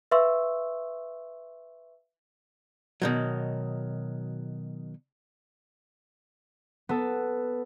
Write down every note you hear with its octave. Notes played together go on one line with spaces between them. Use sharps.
B4 E5 F5 C6 C#6 E6
B2 D#3 F#3
B3 A4